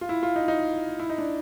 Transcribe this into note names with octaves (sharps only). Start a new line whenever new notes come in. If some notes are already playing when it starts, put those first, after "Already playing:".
F4
E4
F4
D#4
D#4
E4
D#4
D4